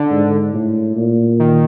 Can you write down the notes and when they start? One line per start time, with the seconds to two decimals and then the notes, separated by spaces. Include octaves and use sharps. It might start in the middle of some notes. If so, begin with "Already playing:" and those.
Already playing: D3
0.11 G#2
0.54 A2
0.97 A#2
1.39 D#3